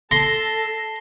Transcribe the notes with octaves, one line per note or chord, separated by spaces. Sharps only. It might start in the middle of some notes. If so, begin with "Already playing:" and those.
A4 A5 C6 A#6